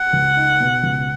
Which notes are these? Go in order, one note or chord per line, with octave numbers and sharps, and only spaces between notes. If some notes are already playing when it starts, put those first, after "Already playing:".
Already playing: F#5
C#2
D#4
B2
C#2